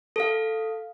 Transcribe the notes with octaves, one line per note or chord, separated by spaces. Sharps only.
A4 F5